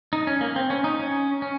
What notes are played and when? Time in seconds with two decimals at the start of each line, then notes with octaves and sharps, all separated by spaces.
0.13 D#4
0.27 C#4
0.41 A#3
0.56 C4
0.70 C#4
0.84 D#4
1.00 C#4
1.42 C#4